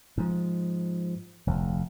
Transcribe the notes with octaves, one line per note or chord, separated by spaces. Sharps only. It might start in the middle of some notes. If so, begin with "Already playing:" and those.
G#2 F3
F1 D2